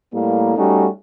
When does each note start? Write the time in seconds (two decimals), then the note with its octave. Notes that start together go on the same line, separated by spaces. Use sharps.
0.13 A2 G3 A#3
0.57 G3 A3 C#4 D#4 F#4